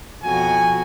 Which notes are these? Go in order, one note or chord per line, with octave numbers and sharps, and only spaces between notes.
F2 B2 F#4 G#5